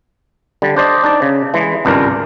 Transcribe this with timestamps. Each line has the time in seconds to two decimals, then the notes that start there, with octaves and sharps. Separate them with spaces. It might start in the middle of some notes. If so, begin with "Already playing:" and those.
0.62 D3 G3
0.77 D4 C5 D5 D#5
1.04 D4 D#4 D5
1.22 C#3
1.54 E3 G#3
1.85 G#1 C#2 G2 D4 A#4